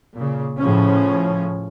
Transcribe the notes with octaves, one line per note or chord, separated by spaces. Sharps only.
A#2 C#3
A2 C#3 F3 C#4